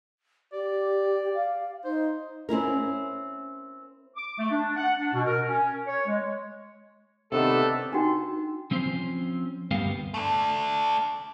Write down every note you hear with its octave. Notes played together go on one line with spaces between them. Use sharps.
G4 D5
F5
D#4 C5
C4 C#4 E4 A#4
D6
A3
D4
F#5
D4
B2
A#4
C#4
C#5
G#3
C3 D#3 A3 B3 D4 A4
D4 D#4 F#4 G5
F3 C4 C#4 C5
D2 G2 A#3 B3 G4 F5
A3 D4